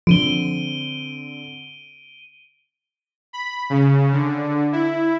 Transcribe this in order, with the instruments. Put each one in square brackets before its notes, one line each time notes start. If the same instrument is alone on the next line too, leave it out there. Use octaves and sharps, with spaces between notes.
[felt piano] D3 C4 [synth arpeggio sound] F3 [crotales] D7 D#7 G7
[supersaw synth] B5
C#3
D3
E4